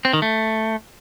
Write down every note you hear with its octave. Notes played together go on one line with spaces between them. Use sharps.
C4
D#3
A3